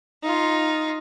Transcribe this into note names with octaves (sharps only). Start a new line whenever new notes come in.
D#4 F4